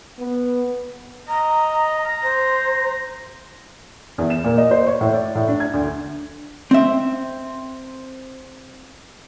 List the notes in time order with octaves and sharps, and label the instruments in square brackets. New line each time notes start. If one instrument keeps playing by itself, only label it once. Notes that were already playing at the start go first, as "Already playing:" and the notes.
[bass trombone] B3
[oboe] D#5 [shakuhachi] A#5
[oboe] A#5
[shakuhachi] C5
[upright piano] E2
E7
A#2
D#5
C5
C#5
A2
D5
A2
D4
G#6
D2
[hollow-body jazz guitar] C4 E5